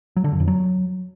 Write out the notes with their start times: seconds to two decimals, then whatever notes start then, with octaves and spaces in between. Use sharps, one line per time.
0.16 F#3
0.24 D3
0.32 F#2
0.40 F2
0.48 F#3